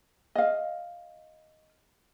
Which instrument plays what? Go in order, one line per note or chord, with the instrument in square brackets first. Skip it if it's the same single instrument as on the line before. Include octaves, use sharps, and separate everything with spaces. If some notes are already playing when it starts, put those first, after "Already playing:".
[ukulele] D#5 F5